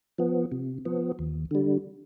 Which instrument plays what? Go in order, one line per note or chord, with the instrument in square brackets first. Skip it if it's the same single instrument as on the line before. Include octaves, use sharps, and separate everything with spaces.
[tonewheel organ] F3 B3
C3
F3 B3
D#2
D3 G3